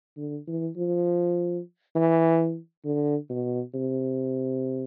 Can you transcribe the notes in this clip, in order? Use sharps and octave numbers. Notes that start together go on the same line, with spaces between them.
D3
E3
F3
E3
D3
B2
C3